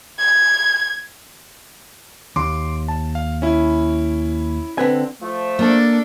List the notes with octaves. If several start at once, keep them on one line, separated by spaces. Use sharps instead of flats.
G#6
D#2 C6 D6
A5
F5
C#4 E4
D3 C4 B4 G#5
F3 A3
A#3 D4 A4